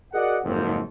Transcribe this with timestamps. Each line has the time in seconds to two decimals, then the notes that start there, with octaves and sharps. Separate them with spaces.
0.13 F#4 G#4 A#4 D5 D#5 F#5
0.44 F#1 F2 G#2